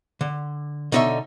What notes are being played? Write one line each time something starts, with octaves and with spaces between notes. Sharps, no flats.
D3
B2 D3 D#4 C#5 D#5 E5